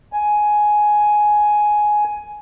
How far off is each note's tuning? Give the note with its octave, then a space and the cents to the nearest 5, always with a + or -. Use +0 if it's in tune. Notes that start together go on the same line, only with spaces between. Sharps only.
G#5 +10